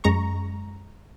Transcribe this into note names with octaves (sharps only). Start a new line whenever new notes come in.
F#2 G#3 A#5 C#6